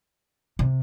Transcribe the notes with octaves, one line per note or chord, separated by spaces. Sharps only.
C3